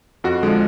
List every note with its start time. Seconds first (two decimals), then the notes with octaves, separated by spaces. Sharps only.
0.24 F2 F#4
0.43 D3 F3 G#3